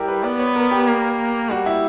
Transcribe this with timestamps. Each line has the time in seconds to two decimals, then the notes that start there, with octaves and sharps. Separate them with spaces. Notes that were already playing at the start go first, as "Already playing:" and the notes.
Already playing: G3 E4 G4 A#4
0.08 B4
0.24 B3 D5
0.39 C#5
0.56 A#4
0.71 G4
0.87 A#3
1.50 G3 F#4
1.66 E4